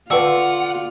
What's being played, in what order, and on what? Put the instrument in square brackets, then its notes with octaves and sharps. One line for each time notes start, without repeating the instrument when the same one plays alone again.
[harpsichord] D3 C#6 [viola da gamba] F4 [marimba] B4 G5 E6 [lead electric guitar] F#5